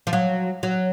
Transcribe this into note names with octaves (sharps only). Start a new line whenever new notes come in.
F3
F#3
F#3